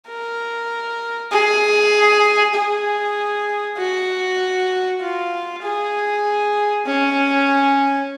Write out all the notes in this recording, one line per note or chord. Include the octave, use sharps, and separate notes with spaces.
A#4
G#4
G#4
F#4
F4
G#4
C#4